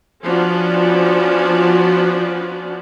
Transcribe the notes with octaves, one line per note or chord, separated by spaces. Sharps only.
F3 B3 C#4 D4 F#4 D5